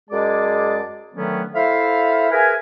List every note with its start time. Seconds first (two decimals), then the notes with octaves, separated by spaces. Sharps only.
0.09 F#2 G#3 G#4 D5 A5 D6
1.14 D3 D#3 F#3 A3 B3 C#4
1.54 E4 A4 C5 E5 F5
2.31 G#4 A#4 B4 E5 G#5